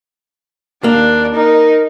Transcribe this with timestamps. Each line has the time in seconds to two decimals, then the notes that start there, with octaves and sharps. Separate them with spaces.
0.84 D#2 A#3 D4
1.35 D#4 A#4